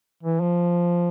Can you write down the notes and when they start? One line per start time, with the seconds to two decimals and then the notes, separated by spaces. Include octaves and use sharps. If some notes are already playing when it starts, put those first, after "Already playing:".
0.23 E3
0.41 F3